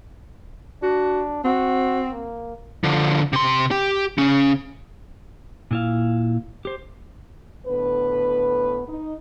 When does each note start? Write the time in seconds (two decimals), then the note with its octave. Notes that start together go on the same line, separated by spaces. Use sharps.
0.83 D4 F#4
1.44 C4 F#4
2.11 A#3
2.84 D3 F3
3.33 C3 C6
3.71 G4
4.18 C#3 C#4
5.71 A#2 E4 F5
6.65 G4 C5
7.67 A2 D3 B3 B4
8.88 D#4